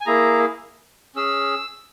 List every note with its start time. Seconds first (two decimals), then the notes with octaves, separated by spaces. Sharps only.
0.01 G#5
0.06 A#3 E4 G#4 A#5
1.16 C#4 G#4 E6